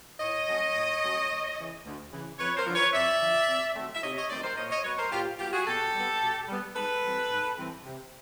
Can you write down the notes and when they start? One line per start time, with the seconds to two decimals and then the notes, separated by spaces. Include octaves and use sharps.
0.20 A2 C#5 D#5
0.47 F#3 A3 C#4
0.75 A2
1.02 F#3 A3 C#4
1.30 D2
1.57 C#3 E3
1.85 D2
2.12 C#3 E3
2.39 F2 B4 C#5
2.57 A#4 C5
2.66 D3 F3
2.76 B4 C#5
2.94 F2 D5 E5
3.20 D3 F3
3.48 C3
3.75 D#3 F#3 A3 C4
3.95 E5
4.03 C3 C#5 D#5
4.16 C#5 D#5
4.30 D#3 F#3 A3 C4 C5 D5
4.43 A#4 C5
4.57 A#2 C#5 D#5
4.71 C#5 D#5
4.84 F#3 B3 B4 C#5
4.98 A#4 C5
5.12 A#2 F4 G4
5.39 F#3 B3 F4 G4
5.53 F#4 G#4
5.67 B2 G4 A4
5.93 G3 B3
6.21 B2
6.48 G3 B3
6.75 G#2 A4 B4
7.03 E3 G3 C4
7.31 G#2
7.57 E3 G3 C4
7.85 C3